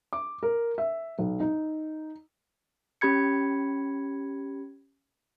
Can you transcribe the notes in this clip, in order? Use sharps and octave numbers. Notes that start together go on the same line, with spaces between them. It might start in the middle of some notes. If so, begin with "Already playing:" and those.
D6
A#4
E5
B1
D#4
C#4 G4 B5 G#6 C#7